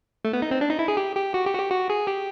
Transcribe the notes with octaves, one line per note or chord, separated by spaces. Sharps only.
A3
B3
D#4
C4
D4
D#4
E4
G#4
G4
G4
F#4
G4
F#4
G4
F#4
G#4
G4